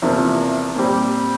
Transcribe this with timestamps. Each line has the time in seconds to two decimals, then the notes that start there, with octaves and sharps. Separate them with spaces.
0.02 E2 C3 F3 A#3
0.76 A#2 G3 C4 G4